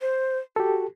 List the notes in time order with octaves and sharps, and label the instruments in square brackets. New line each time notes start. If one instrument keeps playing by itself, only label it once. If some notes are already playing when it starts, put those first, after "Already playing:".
[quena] C5
[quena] F#4 [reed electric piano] G4 A4